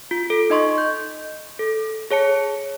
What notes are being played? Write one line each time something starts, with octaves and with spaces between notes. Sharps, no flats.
F4
A4
D#4 D#5 C6 C#6
G6
A4
G#4 C#5 A5 C#7